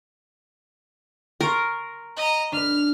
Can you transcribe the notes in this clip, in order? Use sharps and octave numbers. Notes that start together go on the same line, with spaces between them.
A#4 C6 C#6 A6
D#5 A#5
D4 B4 F6